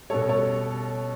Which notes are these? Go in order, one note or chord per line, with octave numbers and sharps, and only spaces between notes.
B2 G3 A4 C#5
A4 C#5